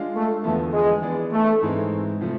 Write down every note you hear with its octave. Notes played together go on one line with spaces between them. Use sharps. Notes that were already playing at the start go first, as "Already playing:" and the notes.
Already playing: G#3 D4 F4
A3
E2 D3 F3 A3 B3
G#3
E3 B3 D4 G#4 D5
A3
G#2 E3 G#3 C4
C3 F3 A3